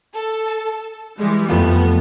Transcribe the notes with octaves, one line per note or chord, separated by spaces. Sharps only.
A4
E3 G3 G#3
F2 A3 B3 F4